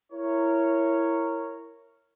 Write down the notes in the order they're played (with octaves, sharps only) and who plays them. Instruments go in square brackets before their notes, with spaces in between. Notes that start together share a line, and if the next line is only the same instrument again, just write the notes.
[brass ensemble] E4 A#4 C#5